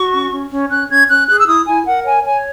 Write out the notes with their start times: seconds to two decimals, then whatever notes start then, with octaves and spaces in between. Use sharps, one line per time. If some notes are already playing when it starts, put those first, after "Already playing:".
Already playing: F#4 C#6
0.12 C#4
0.31 C#4
0.50 C#4
0.69 C#4 F#6
0.89 C#4 G#6
1.08 C#4 F#6
1.28 G#4 F#6
1.39 E6
1.47 E4 D#6
1.66 E4 G#5
1.86 A#4 F#5
2.05 C#5 G#5
2.24 C#5 G#5